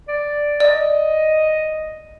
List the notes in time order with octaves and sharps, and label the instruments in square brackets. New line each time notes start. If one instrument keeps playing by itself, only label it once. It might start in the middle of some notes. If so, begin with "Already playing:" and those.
[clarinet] D5
[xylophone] D5 [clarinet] D#5